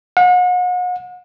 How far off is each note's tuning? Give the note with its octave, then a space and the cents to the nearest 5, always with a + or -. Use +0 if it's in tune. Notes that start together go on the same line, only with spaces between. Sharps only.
F#5 -40